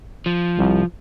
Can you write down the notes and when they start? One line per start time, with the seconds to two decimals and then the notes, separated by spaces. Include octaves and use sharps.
0.26 F3
0.57 C2